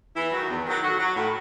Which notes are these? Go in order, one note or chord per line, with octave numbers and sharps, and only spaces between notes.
E2 E3 E4
D#3 F#3
E2
D#3 F#3
A2 F#3 F#4
F#3
A2